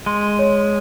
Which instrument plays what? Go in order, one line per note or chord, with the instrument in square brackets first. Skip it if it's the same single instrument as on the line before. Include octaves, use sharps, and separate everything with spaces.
[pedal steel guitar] G#3 [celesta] C6
[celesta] C#5